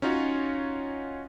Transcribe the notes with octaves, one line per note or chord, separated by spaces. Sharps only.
C#4 D#4 F4 F#4 C#5